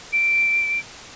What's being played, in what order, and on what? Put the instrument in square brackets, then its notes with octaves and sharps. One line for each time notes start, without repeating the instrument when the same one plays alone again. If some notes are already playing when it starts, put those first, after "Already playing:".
[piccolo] D7